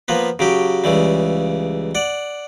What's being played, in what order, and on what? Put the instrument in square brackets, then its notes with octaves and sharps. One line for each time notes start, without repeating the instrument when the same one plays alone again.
[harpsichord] F3 A#3 B3 B4
C#3 F#3 G4
C#2 C#3 E3 G3
D5 F#5